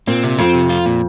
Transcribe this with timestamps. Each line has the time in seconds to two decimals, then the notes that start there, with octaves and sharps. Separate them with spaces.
0.07 A#2 C4
0.24 C3
0.38 F2 C4
0.54 C3
0.69 F4
0.86 A#2